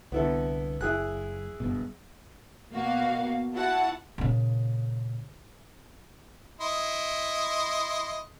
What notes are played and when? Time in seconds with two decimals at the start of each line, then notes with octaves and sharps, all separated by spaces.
0.12 C2 D3 B3 E4 A4
0.81 F#1 E4 G#4 F#6
1.60 F#1 G2 B2
2.73 B2 A#3 F#4 F5
3.54 E4 F#4 F#5 A5
4.18 A#2 C#3
6.61 E4 D#5 C6